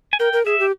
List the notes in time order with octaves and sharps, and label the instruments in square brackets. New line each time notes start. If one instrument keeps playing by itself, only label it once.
[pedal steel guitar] G#5
[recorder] A#4 [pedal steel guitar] G5
[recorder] A#4
[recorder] G#4 [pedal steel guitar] E5
[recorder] G4